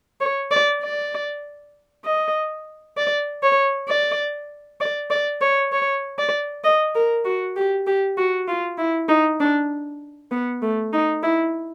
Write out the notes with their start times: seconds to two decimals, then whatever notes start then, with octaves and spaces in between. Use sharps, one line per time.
0.21 C#5
0.51 D5
0.83 D5
2.05 D#5
2.97 D5
3.43 C#5
3.88 D5
4.81 D5
5.10 D5
5.41 C#5
5.72 C#5
6.18 D5
6.64 D#5
6.95 A#4
7.25 F#4
7.56 G4
7.87 G4
8.17 F#4
8.48 F4
8.78 E4
9.08 D#4
9.40 D4
10.31 B3
10.62 A3
10.93 D#4
11.23 E4